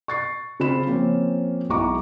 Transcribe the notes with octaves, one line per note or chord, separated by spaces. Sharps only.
C#6 A6 C7
C#3 C4 F4 B5 E7
F3 A#3 C4 C#4
B1 G#3 E4 A#5 C#6 D6